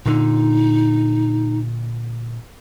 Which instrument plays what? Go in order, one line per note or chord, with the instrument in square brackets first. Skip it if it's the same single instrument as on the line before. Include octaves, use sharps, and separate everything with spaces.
[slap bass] A#2 D3 [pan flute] D#4